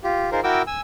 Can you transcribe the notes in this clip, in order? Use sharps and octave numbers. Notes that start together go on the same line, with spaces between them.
F4 G4
D#4 F4 G#4 A#4 C5
E4 F#4 A#4 G5 D6 E6
G#5 E6